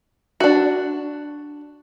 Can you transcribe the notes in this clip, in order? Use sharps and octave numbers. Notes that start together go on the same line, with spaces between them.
D4 F#4